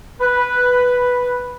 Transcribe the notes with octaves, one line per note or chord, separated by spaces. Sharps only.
B4